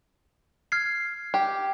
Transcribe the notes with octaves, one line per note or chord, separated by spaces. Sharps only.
F6 G#6 C7
G4